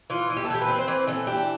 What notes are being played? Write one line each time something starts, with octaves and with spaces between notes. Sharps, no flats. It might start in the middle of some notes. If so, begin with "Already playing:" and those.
E3 F4
E3
G4
A4
E3 G4
B4
C4
C5
E3 B4
E3 A4
D4 G4